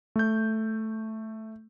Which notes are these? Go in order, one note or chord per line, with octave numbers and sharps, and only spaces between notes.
A3 G6